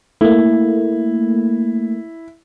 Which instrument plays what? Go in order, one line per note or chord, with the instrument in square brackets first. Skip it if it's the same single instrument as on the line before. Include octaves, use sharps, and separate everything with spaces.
[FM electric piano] A3 A#3 [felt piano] E4